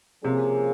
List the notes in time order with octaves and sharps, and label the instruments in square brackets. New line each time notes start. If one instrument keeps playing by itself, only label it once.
[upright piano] C3 [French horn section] F3 A#3 C#4 G#4